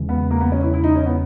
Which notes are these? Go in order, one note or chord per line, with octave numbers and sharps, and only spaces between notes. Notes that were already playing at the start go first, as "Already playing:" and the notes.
Already playing: E2 C#3 E3 G#3
B3
A#3
B3
C#4
E4
E4
D#4
C#4
B3